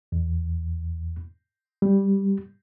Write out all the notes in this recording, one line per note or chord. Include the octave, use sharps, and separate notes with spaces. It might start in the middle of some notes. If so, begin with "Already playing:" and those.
E2
G3